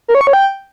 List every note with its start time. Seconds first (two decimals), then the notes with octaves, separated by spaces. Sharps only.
0.08 A#4
0.15 C#5
0.21 C#6
0.27 C#5
0.33 G5